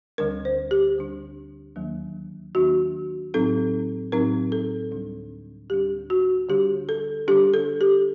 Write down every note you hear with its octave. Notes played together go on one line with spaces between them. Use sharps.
D2 D3 G3 D4 A#4
C5
G4
D2 D3 G3 D4
D#2 D#3 F#3 A#3 D4
D#2 D#3 F#3 A#3 D4 F#4
A2 F#3 C4 D#4 A4
A2 F#3 C4 D#4 A#4
A4
D2 D3 G3 D4
D2 D3 G3 D4 G4
F#4
D3 G3 D4 G4
A4
D3 G3 D4 G4
A4
G4